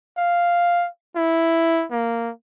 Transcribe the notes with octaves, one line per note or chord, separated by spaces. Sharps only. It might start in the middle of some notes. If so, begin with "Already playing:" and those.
F5
E4
A#3